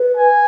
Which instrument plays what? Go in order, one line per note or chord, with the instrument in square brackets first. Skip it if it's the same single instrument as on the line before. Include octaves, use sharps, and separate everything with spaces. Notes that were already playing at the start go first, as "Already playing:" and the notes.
Already playing: [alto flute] B4
[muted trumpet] G#5